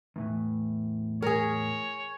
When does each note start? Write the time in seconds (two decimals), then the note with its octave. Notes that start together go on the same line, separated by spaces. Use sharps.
0.16 E2 A2 E3
1.22 G#4 A#4 C#5